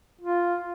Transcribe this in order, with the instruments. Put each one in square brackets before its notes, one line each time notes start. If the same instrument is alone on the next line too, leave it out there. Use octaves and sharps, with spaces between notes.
[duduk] F4